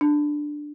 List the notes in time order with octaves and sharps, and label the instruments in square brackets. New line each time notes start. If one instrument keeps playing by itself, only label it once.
[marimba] D4